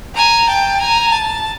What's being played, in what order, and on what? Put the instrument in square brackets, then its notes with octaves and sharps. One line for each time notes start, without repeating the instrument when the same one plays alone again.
[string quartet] G#5 [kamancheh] A#5
[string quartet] G5 [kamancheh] A5
[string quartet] G#5 [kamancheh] A#5
[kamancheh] A5